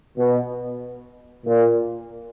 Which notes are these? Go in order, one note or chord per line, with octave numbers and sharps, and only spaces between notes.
B2
A#2